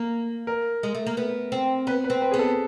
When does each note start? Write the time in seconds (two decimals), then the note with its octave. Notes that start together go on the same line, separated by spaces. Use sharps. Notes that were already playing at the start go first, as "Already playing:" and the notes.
Already playing: A#3
0.47 A#4
0.83 G#3
0.95 A3
1.07 A#3
1.17 B3
1.52 C4
1.87 B3 B4
2.04 B4
2.10 C4
2.22 B4
2.31 B3 G#4
2.39 A4